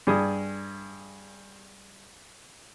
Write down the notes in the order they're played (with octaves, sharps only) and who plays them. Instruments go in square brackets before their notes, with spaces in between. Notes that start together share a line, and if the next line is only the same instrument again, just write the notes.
[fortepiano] G2 G#4 D#6